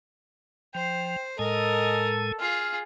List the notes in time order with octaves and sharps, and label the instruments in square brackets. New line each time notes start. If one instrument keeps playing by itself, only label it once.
[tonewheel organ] F3 [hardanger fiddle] C5 [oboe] G5
[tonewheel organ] A2 G#3 G#5 [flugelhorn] A4 [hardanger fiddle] A#4 [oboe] D#5
[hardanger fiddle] F4 G#4 [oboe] F5